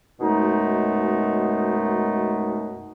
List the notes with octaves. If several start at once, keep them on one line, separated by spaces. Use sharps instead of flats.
F#2 B2 G#3 A3 D#4